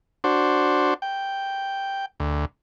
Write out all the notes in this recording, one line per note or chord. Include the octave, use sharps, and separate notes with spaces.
D4 F#4 C5
G5
D2